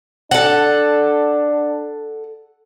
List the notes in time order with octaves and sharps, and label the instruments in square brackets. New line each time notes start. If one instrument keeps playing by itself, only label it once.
[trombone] D4 [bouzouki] A4 F#5